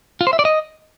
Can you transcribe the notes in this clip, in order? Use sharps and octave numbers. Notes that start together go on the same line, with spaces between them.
F4
C5
E5
D5
D#5